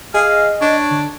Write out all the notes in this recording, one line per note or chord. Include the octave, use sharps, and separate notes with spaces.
G#4 D#5 F5
D4 C#5
D3